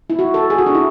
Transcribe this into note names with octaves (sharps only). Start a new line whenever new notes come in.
E4
F#4
A4
G#4
F#4
D4
E4